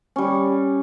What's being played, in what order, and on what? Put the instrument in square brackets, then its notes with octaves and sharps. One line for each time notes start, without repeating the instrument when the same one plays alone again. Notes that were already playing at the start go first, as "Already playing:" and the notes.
[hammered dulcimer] G3 C#4